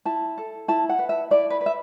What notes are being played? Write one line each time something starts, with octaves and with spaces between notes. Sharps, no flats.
E4 A5
A4
E4 A5
F#5
B4
E5
E4 D5
B4
B4
E5